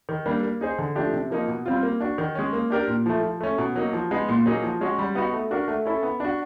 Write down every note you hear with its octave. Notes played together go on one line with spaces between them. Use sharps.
D#3
G3 A#3 D4
A#3
D#4 G#4 C5
D3
F3 A3 D4 G4
C3
F3 A#3 D#4
B2
G3 C4 F4
A#3
D4 F#4
D#3
G#3 C#4
A#3
D4 G4 A#4 D5
A#2
F3 A3
F3
A3 C#4
B2
F#3 A#3 D#4
F3
G#3 B3 D#4
A#2
F#3 A#3 D#4 G#4
F3
G#3 C#4 F#4
G3
B3 D#4 F#4
A3
D4 F#4 A#4
A3
C#4 E4 A4
B3
D4 F#4